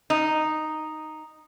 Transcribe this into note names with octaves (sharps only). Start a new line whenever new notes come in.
D#4